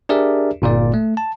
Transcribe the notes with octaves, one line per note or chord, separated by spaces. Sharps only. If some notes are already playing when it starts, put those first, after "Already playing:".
D4 G4 G#4 A#4 D5 E5
G1 A#2 A#3 D5
A3
A5